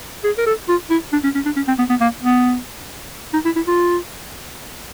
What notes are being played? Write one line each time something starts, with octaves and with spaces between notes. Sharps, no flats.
G#4
A#4
A4
F4
E4
D4
C#4
C#4
D4
C#4
C4
B3
B3
A#3
B3
D#4
E4
E4
F4